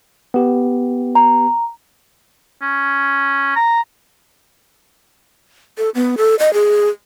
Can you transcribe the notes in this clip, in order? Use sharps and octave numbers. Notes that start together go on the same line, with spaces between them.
B3 G4
A#5
C#4
A#5
A4
B3
A4
D#5
G#4